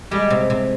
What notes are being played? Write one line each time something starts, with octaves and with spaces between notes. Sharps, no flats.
G3 G#3
C3
C3